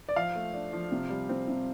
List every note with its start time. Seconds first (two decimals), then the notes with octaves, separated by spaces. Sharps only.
0.09 D5
0.16 F3 F5
0.36 A3
0.53 D4
0.73 F3
0.92 C3
1.10 G3
1.29 C4
1.48 C3